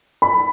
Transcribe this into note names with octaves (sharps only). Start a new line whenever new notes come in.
B5